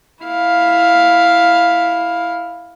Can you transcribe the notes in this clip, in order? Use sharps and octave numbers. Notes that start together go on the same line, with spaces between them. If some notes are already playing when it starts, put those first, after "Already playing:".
E4 F5